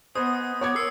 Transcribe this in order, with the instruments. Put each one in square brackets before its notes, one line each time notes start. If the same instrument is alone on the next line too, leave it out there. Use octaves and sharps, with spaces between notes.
[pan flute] B3 [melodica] B4 D#5 G#5 [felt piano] C5 [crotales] D#6
[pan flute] B3 [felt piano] C#5 D6 G#6
[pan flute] A#4 [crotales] E6 C7 C#7